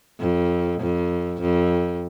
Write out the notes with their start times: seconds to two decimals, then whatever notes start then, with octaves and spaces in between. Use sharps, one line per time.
0.20 F2
0.81 F2
1.42 F2